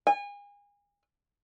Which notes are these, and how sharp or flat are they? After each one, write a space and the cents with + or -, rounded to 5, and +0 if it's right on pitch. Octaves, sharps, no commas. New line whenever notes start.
G#5 -35